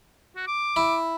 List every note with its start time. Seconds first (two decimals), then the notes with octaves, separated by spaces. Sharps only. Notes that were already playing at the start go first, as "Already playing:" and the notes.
0.36 F#4
0.47 D6
0.76 E4